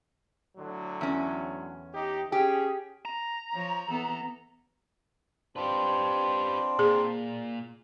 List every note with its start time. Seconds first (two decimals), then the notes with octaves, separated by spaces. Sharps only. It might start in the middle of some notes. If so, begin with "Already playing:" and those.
0.57 A2 D3 F#3
1.01 E2 C#4
1.94 D#4 G4
2.32 C#4 G4 G#4
3.05 A#5
3.55 F3 C#5
3.90 E3 B3 A4
5.56 C4 D4 F4 G4 B4
6.79 A#2 G#4